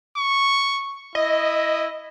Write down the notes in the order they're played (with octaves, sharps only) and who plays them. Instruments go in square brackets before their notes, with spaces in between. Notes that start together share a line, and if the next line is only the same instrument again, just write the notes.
[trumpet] C#6
[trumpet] E4 [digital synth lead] D#5